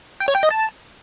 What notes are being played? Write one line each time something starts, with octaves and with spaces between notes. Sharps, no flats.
G5
C#5
G5
D#5
A5